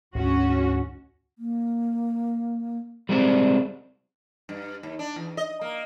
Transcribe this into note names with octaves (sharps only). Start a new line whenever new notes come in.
D2 G#2 C#4 F#4
A#3
G3 G#3 C4 D5
G2
D#2
D4
E2
D#5
A#3